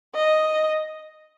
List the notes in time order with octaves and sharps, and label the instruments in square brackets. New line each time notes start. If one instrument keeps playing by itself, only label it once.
[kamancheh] D#5